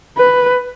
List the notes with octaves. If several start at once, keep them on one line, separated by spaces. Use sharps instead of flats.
B4